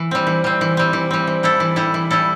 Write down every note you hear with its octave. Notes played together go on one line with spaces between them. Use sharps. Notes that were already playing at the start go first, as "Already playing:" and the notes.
Already playing: E3
G3 C4
E3
G3 C4
E3
G3 C4
E3
G3 C4
E3
G3 E4 A4
E3
G3 E4 A4
E3
G3 E4 A4